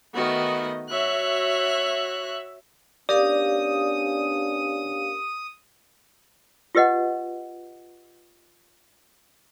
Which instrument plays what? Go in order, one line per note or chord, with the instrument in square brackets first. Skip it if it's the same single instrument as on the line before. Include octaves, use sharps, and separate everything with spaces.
[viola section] D#3 B3 D#5 [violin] A3 F#4
[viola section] F#4 E5 [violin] C#5 F#6
[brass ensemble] B3 C#4 D4 [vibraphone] G4 A#4 F5 [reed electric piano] D5 [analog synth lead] D#6
[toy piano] F4 G4 B4 D#5 F#5